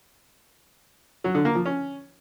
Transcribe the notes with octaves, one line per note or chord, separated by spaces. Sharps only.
F#3
D3
A#3
F3
C#4